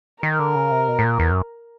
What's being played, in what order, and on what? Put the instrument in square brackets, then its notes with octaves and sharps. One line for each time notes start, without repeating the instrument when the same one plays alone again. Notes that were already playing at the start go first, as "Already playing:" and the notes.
[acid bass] D#3 [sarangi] A#4
[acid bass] D3
C#3
C3
B2
A2
A#2
E2
F#2